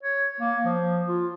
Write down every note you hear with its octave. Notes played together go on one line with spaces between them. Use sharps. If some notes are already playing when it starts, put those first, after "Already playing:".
C#5
A#3
F3
F4